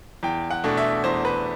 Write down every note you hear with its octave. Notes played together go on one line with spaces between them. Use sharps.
E2 G5
F#5
B2 A3 D4
E5
E2 C5
B4